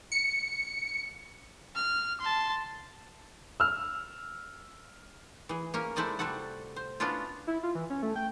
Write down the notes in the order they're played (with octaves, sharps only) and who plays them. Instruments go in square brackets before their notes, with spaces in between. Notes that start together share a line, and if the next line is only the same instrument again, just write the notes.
[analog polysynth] C#7
[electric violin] F6
A5 C6
[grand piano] E6 F6
[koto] E3 G#4
A#3 C#4 A#4
G#3 A3 E4 C5 D5 D#5
C3 G3 F#4 A4 F#5
C5
B3 C#4 D4 E4 F4
[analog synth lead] E4
F4
E3
C#4
A3
G5